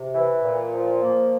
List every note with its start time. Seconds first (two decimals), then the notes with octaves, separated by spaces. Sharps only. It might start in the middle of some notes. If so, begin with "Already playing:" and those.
Already playing: C3
0.14 E3
0.42 A#2
0.73 F3
1.03 A#3